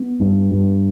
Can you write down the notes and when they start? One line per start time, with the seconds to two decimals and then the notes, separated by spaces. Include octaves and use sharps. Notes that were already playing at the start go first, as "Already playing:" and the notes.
Already playing: B3
0.20 G2
0.52 G2